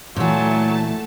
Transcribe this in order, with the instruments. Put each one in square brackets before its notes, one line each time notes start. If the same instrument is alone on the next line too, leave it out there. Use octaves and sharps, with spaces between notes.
[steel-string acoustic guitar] A#2 E3 [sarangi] F#3 [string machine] A3 A5